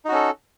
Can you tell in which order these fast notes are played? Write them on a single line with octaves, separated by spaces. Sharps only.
D#4 F#4 C#4 A4